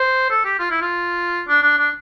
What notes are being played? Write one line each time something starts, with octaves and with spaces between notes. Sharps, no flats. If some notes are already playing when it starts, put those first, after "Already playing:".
Already playing: C5
A4
G4
F4
E4
F4
D4
D4
D4